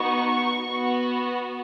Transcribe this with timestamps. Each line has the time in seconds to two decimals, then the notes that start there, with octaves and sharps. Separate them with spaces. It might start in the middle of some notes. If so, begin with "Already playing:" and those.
Already playing: B3 D#4 F#4 C#6
0.67 B3 F#4